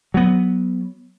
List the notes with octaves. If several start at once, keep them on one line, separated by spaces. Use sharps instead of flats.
F#3 B3